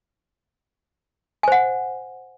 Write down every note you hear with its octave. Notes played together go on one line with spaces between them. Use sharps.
C5 F#5 G#5